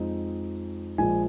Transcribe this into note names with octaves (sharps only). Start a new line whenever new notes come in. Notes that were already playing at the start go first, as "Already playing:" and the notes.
Already playing: F2 F3 G#3 C4 D#4
A#1 A#2 F3 G#3 G#5